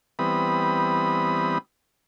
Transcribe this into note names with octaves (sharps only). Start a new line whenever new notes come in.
E3 G3 B3 C4 B5 D#6